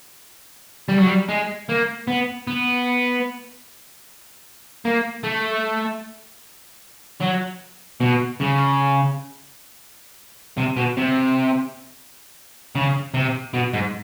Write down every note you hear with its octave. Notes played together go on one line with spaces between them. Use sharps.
G3
F#3
G3
G#3
A#3
B3
B3
A#3
A3
F#3
B2
C#3
C3
B2
C3
C#3
C3
B2
G#2